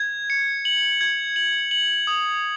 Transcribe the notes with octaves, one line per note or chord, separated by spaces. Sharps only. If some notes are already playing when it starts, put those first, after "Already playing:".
Already playing: G#6
C#7
F#7
G#6
F#7
F#7
D#6